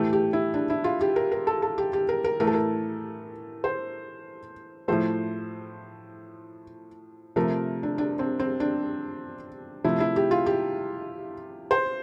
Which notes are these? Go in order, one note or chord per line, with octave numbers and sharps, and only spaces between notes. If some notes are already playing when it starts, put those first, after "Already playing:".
Already playing: A2 E3 A3 G4
G4
E4
D4
E4
F4
G4
A#4
A#4
A4
A4
G4
G4
A#4
A#4
A2 E3 A3 A#4
A4
A#4
C5
A2 F3 A3 C5
C3 F3 A3 A#4
D4
D4
C4
C4
D4
C3 F3 A3 E4
E4
G4
F4
G4
C5